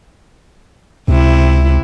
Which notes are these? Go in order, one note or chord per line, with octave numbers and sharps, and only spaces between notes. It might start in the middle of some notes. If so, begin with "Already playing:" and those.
C#2 C3 E4